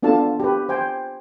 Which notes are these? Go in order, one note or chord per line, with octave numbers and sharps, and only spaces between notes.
B3 D4 F4 A4 A5
G4 B4
C5 G5 G#5